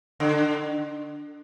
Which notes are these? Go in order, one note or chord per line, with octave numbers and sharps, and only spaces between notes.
D3